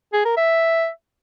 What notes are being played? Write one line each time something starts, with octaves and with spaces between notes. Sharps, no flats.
G#4
A#4
E5